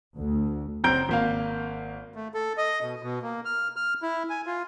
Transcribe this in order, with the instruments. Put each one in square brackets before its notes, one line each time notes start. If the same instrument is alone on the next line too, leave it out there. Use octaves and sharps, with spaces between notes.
[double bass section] D2
[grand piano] F#1 C4 A#5 G6 D7
G#1 A#3 F5
[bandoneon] A3
A4
D#5
B2
B2
A#3
F6
F6
E4
G#5
F4